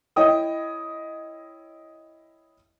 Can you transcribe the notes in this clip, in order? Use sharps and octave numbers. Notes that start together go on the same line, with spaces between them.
E4 C#5 D#5 G5 D#6